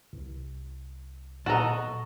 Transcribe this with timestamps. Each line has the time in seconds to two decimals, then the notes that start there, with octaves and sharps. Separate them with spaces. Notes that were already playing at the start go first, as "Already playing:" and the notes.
0.13 C2
1.46 A#2 F#4 A4 D#5 A5 A#5